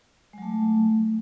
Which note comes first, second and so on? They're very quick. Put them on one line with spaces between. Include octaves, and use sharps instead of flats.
G#3 F#3 A3